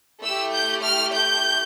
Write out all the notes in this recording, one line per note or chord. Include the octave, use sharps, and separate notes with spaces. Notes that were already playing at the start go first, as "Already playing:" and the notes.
A3 E4 G4 E6
G6
F6
G6